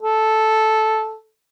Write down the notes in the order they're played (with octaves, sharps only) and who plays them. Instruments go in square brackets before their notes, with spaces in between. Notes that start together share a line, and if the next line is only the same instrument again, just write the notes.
[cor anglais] A4